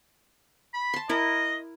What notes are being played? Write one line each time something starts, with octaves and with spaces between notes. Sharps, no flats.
B5
A5 C6
E4 A#4 D#5